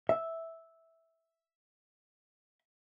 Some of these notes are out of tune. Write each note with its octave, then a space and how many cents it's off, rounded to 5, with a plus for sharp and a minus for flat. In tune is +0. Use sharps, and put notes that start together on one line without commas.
E5 -5